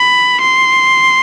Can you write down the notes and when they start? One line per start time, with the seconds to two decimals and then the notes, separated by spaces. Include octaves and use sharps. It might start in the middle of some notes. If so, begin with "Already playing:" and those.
Already playing: B5
0.41 C6